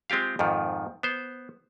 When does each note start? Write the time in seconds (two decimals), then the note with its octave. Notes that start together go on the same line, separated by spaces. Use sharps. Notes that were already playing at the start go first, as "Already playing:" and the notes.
0.10 G#3 C4 F4 G4 F5
0.39 F2 G#2 D#3 F3
1.03 B3 C5